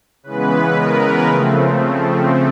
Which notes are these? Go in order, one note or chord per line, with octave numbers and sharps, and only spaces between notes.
C#3 E3 G#3 B3 B4
A#4
C#3 F3 A3 C4